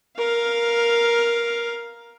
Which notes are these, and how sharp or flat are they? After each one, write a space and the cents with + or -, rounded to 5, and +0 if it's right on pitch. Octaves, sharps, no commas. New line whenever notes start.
A#4 +10 F5 +0